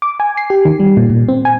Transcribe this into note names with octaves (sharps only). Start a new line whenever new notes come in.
D6
G#5
C7
G4
D#3
G3
A#2
A#2
C4
G#5